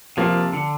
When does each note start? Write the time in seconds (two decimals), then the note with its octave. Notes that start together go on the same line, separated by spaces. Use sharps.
0.17 C3 F3 A#3
0.53 D3